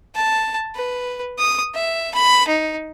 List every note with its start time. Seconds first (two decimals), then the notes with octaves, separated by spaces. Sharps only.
0.15 A5
0.75 B4
1.38 D#6
1.74 E5
2.14 B5
2.47 D#4